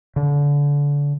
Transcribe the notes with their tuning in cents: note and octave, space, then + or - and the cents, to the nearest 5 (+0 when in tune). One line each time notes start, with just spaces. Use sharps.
D3 -30